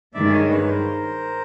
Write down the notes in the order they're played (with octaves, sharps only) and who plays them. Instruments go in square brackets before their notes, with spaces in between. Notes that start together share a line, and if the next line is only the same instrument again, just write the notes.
[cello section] G2 D#3 G#3 [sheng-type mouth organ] D5 E5
[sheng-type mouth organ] E5
C#5 D#5
B4 C#5
A#4 C5